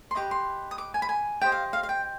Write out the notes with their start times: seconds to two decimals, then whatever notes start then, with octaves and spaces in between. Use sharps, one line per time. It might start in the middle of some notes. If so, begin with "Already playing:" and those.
0.11 C6
0.15 G4 B4 D#5 D6
0.31 C6
0.71 D#6
0.78 D6
0.94 G#5
1.02 B5
1.09 G#5
1.41 G4 C5 D#5 G5
1.52 F5
1.73 F5
1.83 F5
1.89 G5